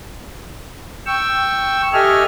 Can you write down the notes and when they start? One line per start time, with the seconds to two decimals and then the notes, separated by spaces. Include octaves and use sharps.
1.06 G5 C#6 E6
1.93 G4 A4 D#5 E5 G#5 F6